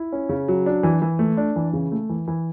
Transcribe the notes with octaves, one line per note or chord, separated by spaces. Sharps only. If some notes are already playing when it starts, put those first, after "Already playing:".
Already playing: E4
C#4
C#3
F#3
D4
E3
E3
A3
D4
E3
C#3
A3
E3
E3